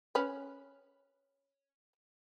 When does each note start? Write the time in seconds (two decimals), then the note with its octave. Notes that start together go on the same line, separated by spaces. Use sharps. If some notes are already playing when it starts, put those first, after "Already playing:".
0.15 C#4 B4